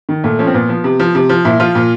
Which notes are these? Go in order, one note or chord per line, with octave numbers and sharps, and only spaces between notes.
D#3
A#2 A3
F3 C#4
C4
A#2 B3
F3
C3
F3
C3
F3
A#2 E4
F3 F4
A#2